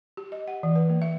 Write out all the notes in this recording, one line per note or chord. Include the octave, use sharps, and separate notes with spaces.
G4
D#5
F#5
E3
B4
A#3
E5